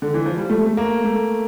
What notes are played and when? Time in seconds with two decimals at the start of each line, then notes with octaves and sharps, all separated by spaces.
0.02 D3
0.14 E3
0.26 F3
0.38 G3
0.50 A3
0.66 A3
0.77 A#3
1.04 A3